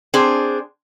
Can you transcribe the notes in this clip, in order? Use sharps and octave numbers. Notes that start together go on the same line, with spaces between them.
C4 D4 G#4 C5